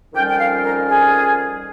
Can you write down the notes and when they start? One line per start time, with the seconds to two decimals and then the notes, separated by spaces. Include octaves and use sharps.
0.14 F2 D#3 G3 C#4 F4 G5
0.27 G5
0.38 F5
0.62 A#4
0.87 G#4